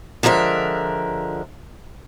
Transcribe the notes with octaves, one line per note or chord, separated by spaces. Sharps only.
D3 F3 G#3 A#4 E5